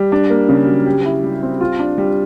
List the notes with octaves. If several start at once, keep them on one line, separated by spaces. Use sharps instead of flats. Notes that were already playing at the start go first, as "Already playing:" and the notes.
Already playing: G3
D4
A#3
C#3
F#3
G4
E4
G3
C4
F4
D4
G3